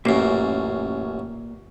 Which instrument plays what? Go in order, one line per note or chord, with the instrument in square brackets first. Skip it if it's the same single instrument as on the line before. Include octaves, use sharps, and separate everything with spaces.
[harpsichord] A1 F#2 [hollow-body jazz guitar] A#2 A#3